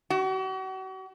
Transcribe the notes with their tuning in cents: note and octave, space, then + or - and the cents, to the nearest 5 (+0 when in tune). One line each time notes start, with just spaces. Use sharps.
F#4 +40